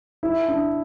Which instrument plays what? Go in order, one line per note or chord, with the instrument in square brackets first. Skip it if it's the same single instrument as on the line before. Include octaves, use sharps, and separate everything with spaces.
[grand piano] E4
D4